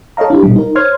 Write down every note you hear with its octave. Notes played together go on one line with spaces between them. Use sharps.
A4 C#5 D#5 F5 A#5
D4 E4 G4
B2 G3
D#4 A#4
C5 C#5 C6 F6 G#6